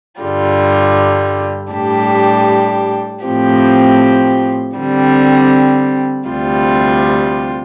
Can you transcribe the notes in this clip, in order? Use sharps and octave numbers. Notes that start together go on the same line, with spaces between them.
G2 D3 G3 F4
A2 G3 D4 G4
A2 F3 C4 G4
D3 G3 C4
D2 C3 G3 F4